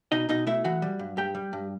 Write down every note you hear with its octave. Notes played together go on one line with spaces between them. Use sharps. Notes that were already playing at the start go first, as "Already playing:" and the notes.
B2 D#4 D#5
B2 D#4 D#5
A3 E4 E5
E3 F#4 F#5
G3
G2
G2 G4 G5
G3
G2